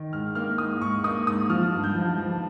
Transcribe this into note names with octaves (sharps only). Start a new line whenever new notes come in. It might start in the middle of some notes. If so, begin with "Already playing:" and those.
Already playing: D#3
G#2 F6
A#3 F6
G#2 D#6
G#2 C#6
A#3 D#6
G#2 D#6
F3 F6
G2
G6
F3
F3